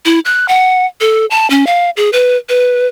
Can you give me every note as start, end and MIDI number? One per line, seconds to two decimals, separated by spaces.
0.05 0.20 64
0.25 0.46 90
0.48 0.86 78
1.01 1.26 69
1.31 1.49 81
1.50 1.66 61
1.67 1.90 77
1.97 2.10 68
2.13 2.36 71
2.49 2.87 71